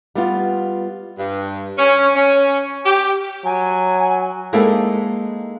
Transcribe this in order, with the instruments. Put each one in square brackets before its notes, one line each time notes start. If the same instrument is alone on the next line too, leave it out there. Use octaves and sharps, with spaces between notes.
[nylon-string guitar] G3 B3 F4
[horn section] G2
C#4
C#4
G4
[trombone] F#3 [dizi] G#5
[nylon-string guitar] G#3 A#3 C4 D#4 E4 A4